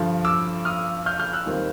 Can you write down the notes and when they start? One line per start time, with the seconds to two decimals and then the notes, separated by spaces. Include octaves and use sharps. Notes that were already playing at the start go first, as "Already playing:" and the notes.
Already playing: G2 D3 F3
0.25 D6 E6
0.65 D#6 F6
1.06 F6 G6
1.19 F6 G6
1.33 E6 F#6
1.46 D#2 D#3 G3 C4 F4